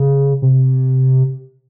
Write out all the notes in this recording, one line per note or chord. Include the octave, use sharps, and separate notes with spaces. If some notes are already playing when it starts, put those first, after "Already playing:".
Already playing: C#3
C3